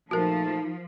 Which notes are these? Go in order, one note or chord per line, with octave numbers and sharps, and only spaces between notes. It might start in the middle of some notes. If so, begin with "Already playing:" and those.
A#2 F3 A3 D#4 F#4 A#4 A5